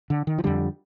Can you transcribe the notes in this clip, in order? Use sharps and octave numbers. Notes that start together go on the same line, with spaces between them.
D3
D#3
F3
F2 D3 G3